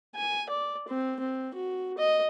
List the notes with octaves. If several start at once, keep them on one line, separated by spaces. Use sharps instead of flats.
G#5
D5
C4
C4
F#4
D#5